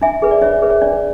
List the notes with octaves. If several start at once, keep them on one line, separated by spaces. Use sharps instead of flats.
D4 E5 G#5
G#4 B4
D5
D4 C#5 E5
G#4 B4
C#5
D4 D5